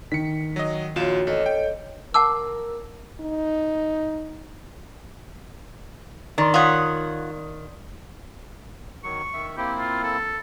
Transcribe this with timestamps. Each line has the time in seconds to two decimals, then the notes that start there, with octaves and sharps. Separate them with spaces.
0.12 D#3 B6 C#7
0.56 F#3 D#5
0.96 A#1 F4 F#4 C#5 E7
1.27 A1 A4 C#5 D#5
1.46 G5
2.14 A#4 F#5 A5 D6 E6
3.21 D#4
6.38 D#3 D5 C6
6.54 F4 C#5 F#5 D#6 G#6 B6
9.04 D#3 F#3 C#6
9.34 D#3 E5
9.57 A#3 C4 E4 G4
9.79 F4
10.03 A4